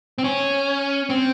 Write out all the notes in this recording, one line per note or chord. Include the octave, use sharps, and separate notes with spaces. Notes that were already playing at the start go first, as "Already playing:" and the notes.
C4
C#4
C4